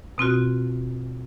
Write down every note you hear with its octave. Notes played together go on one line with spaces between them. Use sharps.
B2 C4 F4 F#4